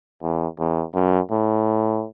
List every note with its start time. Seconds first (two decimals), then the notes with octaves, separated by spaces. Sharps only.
0.22 E2
0.59 E2
0.94 F#2
1.30 A2